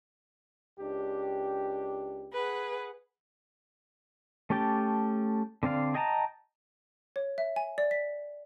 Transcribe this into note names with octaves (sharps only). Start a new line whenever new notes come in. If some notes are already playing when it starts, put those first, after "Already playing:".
C#2 D4 G4
G#4 B4 F#5
A3 C#4 G4 G5 A5
D3 C4 D5 F5
G#4 D#5 G5 A5 A#5
C#5
E5
G#5
D5
B6